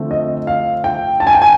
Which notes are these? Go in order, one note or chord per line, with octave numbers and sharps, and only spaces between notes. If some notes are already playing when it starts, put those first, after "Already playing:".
Already playing: D3 F3 A3 C4
D#5
F5
G5
A5
G#5
G5
G#5